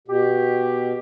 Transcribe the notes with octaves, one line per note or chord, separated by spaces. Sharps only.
B2 G4